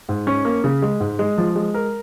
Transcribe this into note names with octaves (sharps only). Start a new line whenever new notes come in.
G#2
C#4
A#3
C#3
G#3
G#2
G#3
F3
G#3
A#4